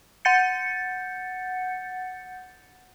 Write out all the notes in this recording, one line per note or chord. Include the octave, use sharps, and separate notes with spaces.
F#5 G6 A6 C#7